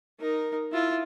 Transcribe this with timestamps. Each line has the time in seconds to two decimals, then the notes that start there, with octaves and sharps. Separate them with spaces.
0.20 D#4 A#4
0.72 E4 F4